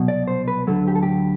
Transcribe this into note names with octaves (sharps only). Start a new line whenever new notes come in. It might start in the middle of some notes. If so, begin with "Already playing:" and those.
Already playing: C2 B2 F#3
D5
C5
B4
D2 D3 F#3 A4
G4
A4
G4